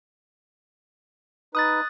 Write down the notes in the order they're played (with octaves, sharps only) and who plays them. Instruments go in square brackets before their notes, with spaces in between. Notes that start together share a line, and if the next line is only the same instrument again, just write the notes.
[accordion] D#4 B4 [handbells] D#6 F#6 A6